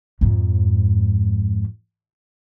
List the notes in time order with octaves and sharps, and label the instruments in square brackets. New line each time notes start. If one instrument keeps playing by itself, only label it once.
[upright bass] F2 G#2